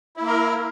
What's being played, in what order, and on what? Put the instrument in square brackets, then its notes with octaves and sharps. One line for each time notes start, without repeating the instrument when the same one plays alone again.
[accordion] E4
A#3
A#4